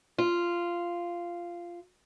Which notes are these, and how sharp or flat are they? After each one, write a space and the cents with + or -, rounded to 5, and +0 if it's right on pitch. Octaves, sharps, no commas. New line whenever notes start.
F4 -10